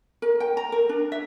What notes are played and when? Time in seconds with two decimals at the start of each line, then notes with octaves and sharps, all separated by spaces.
0.22 A#4
0.40 G5
0.57 A#5
0.72 A#4
0.89 D4
1.12 E5